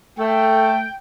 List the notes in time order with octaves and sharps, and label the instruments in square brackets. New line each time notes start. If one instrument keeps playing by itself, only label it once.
[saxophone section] A3 [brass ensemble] G5